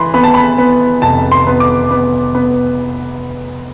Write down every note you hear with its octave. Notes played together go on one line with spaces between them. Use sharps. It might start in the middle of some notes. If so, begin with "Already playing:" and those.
Already playing: E3 B5 C6
B3 B5
A5
B5
B3
F1 A5
C6
B3
D6
B3
B3